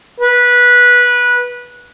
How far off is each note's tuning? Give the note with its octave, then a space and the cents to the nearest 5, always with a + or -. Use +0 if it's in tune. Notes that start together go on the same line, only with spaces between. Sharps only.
B4 -15